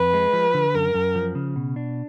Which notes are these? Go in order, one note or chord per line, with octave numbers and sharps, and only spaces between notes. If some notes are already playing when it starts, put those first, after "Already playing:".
Already playing: F2 B4
G#3
F3
D3
F#2 A#4
F#2
F3
C#3
B2
D4